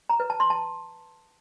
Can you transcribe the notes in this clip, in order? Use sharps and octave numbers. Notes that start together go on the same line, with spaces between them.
A#5
B4
A5
C6
A5